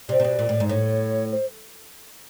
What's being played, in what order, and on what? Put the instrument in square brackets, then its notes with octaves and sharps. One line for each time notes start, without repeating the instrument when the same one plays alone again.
[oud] C3 [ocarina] D5
[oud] C3
B2
A#2
A2
G#2
[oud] A2 [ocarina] C#5
[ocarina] C5